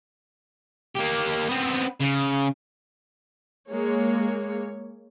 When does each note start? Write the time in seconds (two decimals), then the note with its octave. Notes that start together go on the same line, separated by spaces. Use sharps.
0.97 A#3 G4
1.49 B3 C4
2.00 C#3
3.70 G#3 A#3 C#5